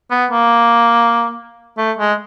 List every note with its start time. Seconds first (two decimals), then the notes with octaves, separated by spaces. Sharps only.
0.11 B3
0.31 A#3
1.78 A3
1.99 G#3